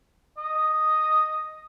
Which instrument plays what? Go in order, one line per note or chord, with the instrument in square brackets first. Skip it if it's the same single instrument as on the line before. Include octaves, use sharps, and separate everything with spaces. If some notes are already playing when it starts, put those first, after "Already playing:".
[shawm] D#5